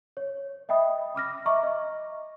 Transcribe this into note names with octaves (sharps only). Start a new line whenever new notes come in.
C#5
D#5 E5 G5 B5 D#6
B5 D6 F6 A#6
D#5 E5 A#5 C#6 D6 F6
D#5